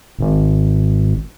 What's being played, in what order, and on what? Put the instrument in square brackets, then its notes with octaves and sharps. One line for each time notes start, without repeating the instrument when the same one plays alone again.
[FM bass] G#1